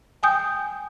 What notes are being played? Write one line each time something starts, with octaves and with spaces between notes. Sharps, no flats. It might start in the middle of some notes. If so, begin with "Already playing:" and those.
G5 G#5 D#6 G6